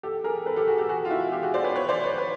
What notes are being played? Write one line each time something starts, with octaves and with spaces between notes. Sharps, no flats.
G4 A4
G#4 A#4
A4 B4
G4 A4
F#4 G#4
G4 A4
F#4 G#4
F4
E4 F#4
F4 G4
F#4 G#4
C5 D5
B4 C#5
B4 C#5
C5 D5
B4 C#5
B4 C#5